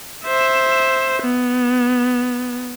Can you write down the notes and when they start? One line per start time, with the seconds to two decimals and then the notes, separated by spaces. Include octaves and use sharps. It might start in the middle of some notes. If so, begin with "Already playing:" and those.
0.26 C5 E5
1.23 B3